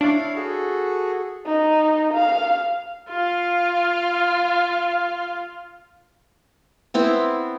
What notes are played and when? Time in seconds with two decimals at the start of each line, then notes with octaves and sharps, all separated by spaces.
0.01 D4 E4 C#5 F5
0.36 F#4 G#4 A4
1.46 D#4
2.14 F5
3.10 F4 F5
6.94 B3 C4 E4